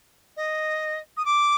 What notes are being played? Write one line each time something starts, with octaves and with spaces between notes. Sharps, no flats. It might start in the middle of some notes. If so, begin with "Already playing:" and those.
D#5
D#6
D6